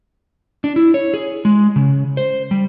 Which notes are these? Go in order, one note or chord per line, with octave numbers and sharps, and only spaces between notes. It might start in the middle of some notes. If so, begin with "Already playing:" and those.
D4
E4
C#5
G#4
G#3
C#3
C5
G3